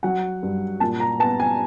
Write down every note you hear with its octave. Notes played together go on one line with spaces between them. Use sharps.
F#3 F#5
G2
A#2 A5
A#5
B3 A5
G#5